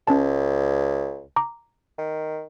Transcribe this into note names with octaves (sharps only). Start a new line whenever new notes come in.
C#2 C#4 A5
A#5 D6
D#3